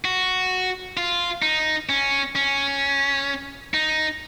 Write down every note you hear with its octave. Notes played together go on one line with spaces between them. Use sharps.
F#4
F4
D#4
C#4
C#4
D#4